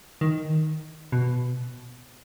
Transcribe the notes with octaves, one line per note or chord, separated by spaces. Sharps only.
D#3
B2